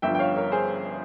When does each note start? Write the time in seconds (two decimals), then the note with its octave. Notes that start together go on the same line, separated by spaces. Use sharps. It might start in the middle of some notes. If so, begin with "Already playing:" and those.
0.02 G1 G2 F3 E5 G5
0.15 G5
0.19 C#5 F5
0.36 A#4 C#5
0.52 G#4 C5